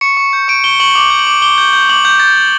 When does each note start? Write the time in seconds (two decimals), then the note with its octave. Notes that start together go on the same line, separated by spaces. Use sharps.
0.01 C#6 C#7
0.17 C#6
0.33 G6
0.48 C#6 D7
0.64 C#6 G7
0.80 C#6 F#7
0.95 D6 F#7
1.10 G6
1.19 F#7
1.27 D6
1.42 D6 G7
1.58 G6
1.73 G6
1.90 D6 F#7
2.04 D6 G6
2.20 G6 A6
2.36 G6